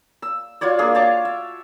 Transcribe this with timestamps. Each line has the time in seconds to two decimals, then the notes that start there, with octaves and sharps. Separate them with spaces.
0.22 E6
0.61 F4 F#4 C#5 D5
0.79 A#3 D4 G#4
0.95 C#5 A5 D6
1.25 E5